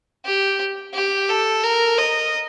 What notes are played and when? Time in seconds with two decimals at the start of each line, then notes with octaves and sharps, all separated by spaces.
0.25 G4
0.94 G4
1.29 A4
1.63 A#4
1.98 D#5